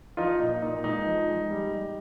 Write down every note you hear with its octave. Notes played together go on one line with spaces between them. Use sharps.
F3 D#4 F4
A#2 D#4
A#2 D#4
G#3 D#4
F3
G#3
G3
G3